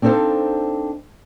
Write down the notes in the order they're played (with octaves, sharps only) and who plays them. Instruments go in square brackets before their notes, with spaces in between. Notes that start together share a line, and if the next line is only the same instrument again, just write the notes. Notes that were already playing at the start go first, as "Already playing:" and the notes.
[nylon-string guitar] C4 D4 D#4 A4 C5 F5